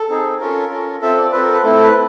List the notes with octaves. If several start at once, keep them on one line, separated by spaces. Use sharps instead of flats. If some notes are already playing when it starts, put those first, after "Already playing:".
Already playing: A4
C4 D#4 G#4
C#4 F4 A4 A#4
C#4 F4 A4
C4 F4 A4 E5
D5
C4 F4 A4 B4
A#4
B4
A3 C4 E4 A4
B4